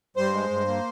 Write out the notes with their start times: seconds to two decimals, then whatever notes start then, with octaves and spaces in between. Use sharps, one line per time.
0.17 G2 C5
0.34 G#3
0.50 G2
0.68 A#3